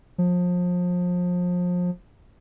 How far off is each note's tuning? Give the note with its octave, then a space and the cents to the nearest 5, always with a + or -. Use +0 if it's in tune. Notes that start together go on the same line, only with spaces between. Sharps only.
F3 +30